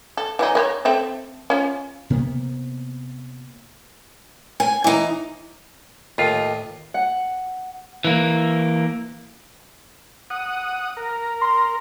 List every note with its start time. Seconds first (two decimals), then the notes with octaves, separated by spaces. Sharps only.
0.17 A4
0.39 E3 F#3 D#4
0.55 A#4 B4 C#5
0.85 C4 A4 E5
1.50 C#4 F4
2.10 C3 A#3 B3
4.60 G#5
4.84 E3 D#4
6.18 D#2 A2 D#3 F4
6.94 F#5
8.04 E3 A#3
10.30 F#5 D#6
10.97 A#4
11.41 C6